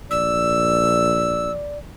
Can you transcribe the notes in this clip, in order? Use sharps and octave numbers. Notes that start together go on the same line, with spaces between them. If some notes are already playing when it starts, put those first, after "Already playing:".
A#1 D5 E6